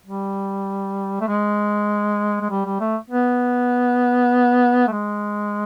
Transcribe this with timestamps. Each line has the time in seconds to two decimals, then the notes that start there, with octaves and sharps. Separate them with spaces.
0.06 G3
1.21 A3
1.28 G#3
2.41 G#3
2.50 G3
2.65 G3
2.80 A3
3.10 B3
4.88 A3
4.92 G#3